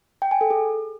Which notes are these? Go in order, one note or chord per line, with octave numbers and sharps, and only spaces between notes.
G5
G#5
A4
G#4